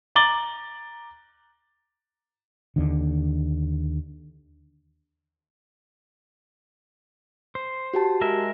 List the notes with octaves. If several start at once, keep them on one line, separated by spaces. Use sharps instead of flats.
A#5 D6 A6 F#7 G7
D#2 D3
C5
F#4 G4 A5
G#3 A#4 E5